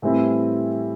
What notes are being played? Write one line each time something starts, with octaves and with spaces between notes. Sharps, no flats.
A2 E3 G3 C4 E4